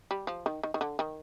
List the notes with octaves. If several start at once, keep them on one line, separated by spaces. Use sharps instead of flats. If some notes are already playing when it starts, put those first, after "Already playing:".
G3
F3
D#3
D#3
D#3
D3
D#3